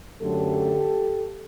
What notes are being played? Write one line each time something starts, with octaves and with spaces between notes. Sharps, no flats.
F#2 D3 F#3 A3 G4 A4